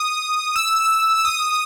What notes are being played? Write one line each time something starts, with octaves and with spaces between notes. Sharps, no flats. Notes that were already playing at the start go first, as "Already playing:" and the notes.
Already playing: D#6
E6
E6
D#6